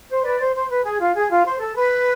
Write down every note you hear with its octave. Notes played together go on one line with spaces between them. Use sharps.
C5
B4 D5
C5
C5
B4
G#4
F4
G#4
F4
C5
A4
B4